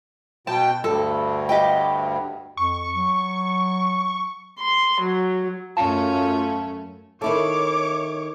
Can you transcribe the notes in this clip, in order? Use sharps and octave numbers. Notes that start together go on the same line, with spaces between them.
B2 G5 A5
D2 G2 A4
G4 D#5 G5
F2 C#6
F#3
C6
F#3
F#2 A3 C#4 F4 A5
D#3 E4 A4 C#5 D6